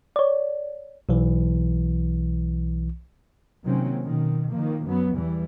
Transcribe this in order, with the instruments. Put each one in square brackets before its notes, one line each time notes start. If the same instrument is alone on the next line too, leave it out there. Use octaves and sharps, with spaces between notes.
[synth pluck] C#5 D5
[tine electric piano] B1 E3
[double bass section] C3 D#3 F#3 A#3 C4 C#4
B2 D#3
D#3 F3 A#3
F#2 F#3 B3
E2 E3 G3